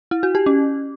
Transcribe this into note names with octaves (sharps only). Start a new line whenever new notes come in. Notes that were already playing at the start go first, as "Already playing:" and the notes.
E4
F#4
G4
C#4